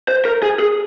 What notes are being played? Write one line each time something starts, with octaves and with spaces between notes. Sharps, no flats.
C5
A#4
G#4
G#4